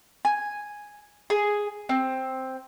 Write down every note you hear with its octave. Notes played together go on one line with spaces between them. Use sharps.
G#5
G#4
C4